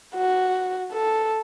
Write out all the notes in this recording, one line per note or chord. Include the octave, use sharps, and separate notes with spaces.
F#4
A4